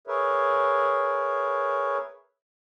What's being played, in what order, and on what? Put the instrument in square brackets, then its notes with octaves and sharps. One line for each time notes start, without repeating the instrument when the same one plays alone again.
[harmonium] G#4 A#4 B4 C#5 E5